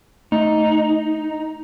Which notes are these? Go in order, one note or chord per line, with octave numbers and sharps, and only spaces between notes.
A3 D#4